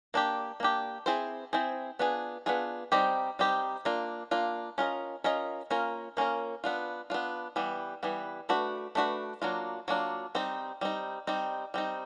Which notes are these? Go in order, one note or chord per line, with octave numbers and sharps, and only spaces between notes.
A#3 D4 G4
A#3 D4 G4
C4 E4 G#4 C5
C4 E4 G#4 C5
B3 D4 F4 G#4
B3 D4 F4 G#4
G3 C4 D#4 G4 C5
G3 C4 D#4 G4 C5
A#3 D4 F4
A#3 D4 F4
C#4 F4 A#4 D#5
C#4 F4 A#4 D#5
A#3 C#4 F4 A#4
A#3 C#4 F4 A#4
B3 D4 F4
B3 D4 F4
E3 G3 B3
E3 G3 B3
A3 D4 F#4 B4
A3 D4 F#4 B4
F#3 A#3 D4 F4
F#3 A#3 D4 F4
G3 C4 D#4
G3 C4 D#4
G3 C4 D#4
G3 C4 D#4